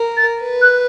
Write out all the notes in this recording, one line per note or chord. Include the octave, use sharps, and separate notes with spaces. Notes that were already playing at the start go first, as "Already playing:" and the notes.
Already playing: A#4
A6
B4
F#6